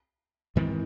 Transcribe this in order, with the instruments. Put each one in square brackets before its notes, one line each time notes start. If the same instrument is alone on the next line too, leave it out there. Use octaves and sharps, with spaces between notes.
[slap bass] G#2 D#3 G#3 C4 [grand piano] E3